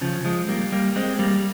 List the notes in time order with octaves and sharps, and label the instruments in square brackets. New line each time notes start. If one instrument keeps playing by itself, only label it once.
[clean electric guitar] C#3 F3
F3 G#3
G3 A#3
G3 A#3
G#3 C4
G3 A#3